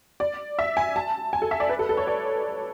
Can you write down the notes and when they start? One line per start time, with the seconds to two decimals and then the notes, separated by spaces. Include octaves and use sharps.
0.20 D5
0.59 E5
0.77 G#5
0.96 A5
1.33 G#5
1.42 A4
1.51 E5
1.60 D5
1.69 B4
1.79 A4
1.89 A4
1.97 C#5
2.07 D5